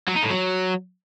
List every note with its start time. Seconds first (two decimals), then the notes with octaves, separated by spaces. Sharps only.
0.08 F#3
0.15 D#4
0.23 A2
0.30 F#3